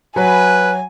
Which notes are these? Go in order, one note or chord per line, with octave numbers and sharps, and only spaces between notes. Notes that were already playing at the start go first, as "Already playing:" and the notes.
F#3 B4 G#5